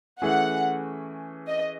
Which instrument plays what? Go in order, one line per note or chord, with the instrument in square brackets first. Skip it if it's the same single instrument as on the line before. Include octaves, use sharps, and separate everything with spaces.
[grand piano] E3 A3 C#4 G#4 [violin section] F#5
[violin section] D#5